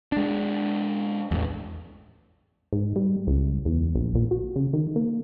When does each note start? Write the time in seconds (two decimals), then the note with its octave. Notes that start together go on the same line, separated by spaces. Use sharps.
0.12 G#3 D4
1.31 A1 E2
2.73 G#2
2.96 G3
3.27 C#2
3.65 E2
3.95 A#1
4.15 A#2
4.31 F#4
4.56 C#3
4.73 D#3
4.96 A#3